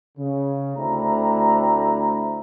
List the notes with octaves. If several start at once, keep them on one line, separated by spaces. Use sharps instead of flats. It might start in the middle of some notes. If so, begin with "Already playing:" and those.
C#3
D2 A3 C4 D4 E4 A#5